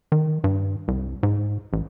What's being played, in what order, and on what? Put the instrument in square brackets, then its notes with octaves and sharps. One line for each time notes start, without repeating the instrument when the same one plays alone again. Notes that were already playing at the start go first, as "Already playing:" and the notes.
[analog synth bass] D#3
G2
C2
G#2
A1